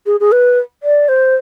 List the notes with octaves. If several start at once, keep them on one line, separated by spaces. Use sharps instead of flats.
G#4
G#4
B4
D5
C5